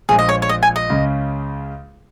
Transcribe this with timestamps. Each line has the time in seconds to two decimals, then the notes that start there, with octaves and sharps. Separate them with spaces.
0.09 A#1 A#2 G#3 G#4
0.19 D#5
0.29 C#5
0.42 C#5
0.49 D#5
0.63 G#5
0.76 D#5
0.90 C#2 C#3 G#3 C#4